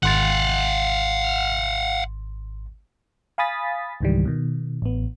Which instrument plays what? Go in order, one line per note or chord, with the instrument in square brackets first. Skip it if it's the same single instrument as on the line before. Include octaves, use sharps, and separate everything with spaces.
[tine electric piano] G#1 C6 A6 [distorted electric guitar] F5 F#5
[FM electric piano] F5 G#5 B5 D#6 A6 B6
C#2 G#2 D#3 E3 G3
B2 D#3
A1 B3